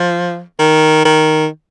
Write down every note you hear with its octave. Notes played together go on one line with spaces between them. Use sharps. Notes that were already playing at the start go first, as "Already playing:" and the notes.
Already playing: F3
D#3
D#3